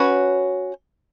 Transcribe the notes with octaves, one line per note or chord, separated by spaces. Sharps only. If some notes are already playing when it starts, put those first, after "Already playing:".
Already playing: C#4 F#4 B4